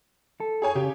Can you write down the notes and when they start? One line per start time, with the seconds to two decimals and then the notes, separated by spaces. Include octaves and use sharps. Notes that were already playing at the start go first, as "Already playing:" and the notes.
0.40 A4
0.62 G#4 C#5 G#5
0.75 C#3 G4